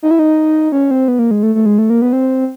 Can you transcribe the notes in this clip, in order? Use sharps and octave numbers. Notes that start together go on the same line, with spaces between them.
D#4
E4
D#4
C#4
C4
B3
A#3
G#3
A3
A3
G#3
A3
A#3
B3
C4